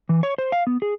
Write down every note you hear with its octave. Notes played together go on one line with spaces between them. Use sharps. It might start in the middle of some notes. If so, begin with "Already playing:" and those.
E3
C#5
C5
F5
B3
G#4